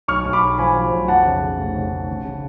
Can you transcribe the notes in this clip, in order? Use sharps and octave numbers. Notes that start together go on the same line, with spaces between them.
B1 C#6 F6
B1
B5 D6
B1
F3 G#5 B5
F3
B1
F2 F#5 A5
C#3
C#3
F1
C#3
F1
C#3
C#3